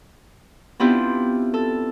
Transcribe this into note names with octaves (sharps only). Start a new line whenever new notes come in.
B3 C4 D4 E4 F4 G4
A4